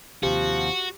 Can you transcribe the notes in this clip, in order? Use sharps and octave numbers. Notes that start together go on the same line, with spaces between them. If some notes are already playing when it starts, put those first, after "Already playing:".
D#2 C3 F3 F#4 G4